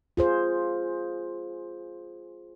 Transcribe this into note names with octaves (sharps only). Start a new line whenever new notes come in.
F4 G#4 C5